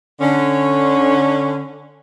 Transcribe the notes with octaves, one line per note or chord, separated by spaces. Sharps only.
D3 C#4